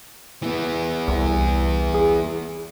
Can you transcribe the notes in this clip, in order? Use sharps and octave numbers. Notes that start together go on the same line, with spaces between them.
E3 B3
C2
G#4